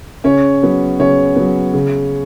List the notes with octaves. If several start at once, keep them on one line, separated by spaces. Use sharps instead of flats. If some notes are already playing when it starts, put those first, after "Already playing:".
C#3 C#4 C#5
F#3 B3
C#3 C#4 C#5
F#3 B3
C#3